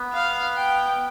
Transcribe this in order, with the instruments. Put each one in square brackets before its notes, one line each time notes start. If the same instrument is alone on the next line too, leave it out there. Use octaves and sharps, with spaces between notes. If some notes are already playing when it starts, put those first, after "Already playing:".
Already playing: [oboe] B3
[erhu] F5
G5